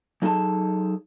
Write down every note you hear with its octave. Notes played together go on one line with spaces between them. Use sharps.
F#3 D#4 G#4 A4 A5